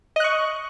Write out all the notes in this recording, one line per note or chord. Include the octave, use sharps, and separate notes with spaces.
D#5 C#6 F#6